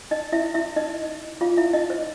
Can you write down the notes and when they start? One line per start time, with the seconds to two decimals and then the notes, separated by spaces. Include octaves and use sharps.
0.11 D#4 D#5
0.32 E4 E5
0.54 E4 E5
0.76 D#4 D#5
1.41 F4 F5
1.57 E4 E5
1.73 D#4 D#5
1.90 C5